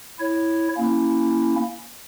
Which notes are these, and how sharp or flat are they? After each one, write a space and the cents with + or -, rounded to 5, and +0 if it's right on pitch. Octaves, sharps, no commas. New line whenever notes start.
E4 -5 C#5 -5
A#3 +0 C#4 +0 E4 +0